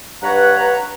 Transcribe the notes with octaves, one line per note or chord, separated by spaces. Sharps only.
G2 B4 C#5 F#5 A#5